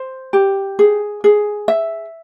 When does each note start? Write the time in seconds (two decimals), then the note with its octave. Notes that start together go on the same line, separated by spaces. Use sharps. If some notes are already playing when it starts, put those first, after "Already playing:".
Already playing: C5
0.33 G4
0.79 G#4
1.24 G#4
1.68 E5